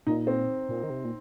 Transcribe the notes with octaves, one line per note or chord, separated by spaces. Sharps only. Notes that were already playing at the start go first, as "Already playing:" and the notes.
A#2 D#4
C4
A#2
D#3
C3
A#2